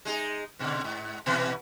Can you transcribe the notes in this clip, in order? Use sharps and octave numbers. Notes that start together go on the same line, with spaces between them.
G#3 D#4 G#4
G#2 B2 D3
G#2
B2 E3 B3